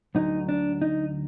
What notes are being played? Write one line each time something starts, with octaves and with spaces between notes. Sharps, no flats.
D2 D3 F#3 D#4
D4
D#4